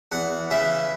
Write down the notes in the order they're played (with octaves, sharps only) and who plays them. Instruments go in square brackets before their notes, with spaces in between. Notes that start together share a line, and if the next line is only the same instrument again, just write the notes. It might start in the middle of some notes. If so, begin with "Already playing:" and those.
[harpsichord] E2 F#5
C#3 E3 E5